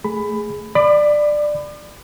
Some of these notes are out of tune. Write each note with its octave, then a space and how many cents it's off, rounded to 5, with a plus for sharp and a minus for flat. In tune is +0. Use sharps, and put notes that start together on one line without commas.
A3 +0 G#4 +0 B5 +15
D5 +15 B5 +20 D6 +40